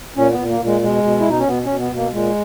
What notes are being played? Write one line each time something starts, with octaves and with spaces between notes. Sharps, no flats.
A#2 C#4
B3
A#2
A#3
A#2
G#3
B2 G#3
B2
E4
B2 D#4
C#4
B2 B3
B2 C#4
B3
B2 A#3
A#2 G#3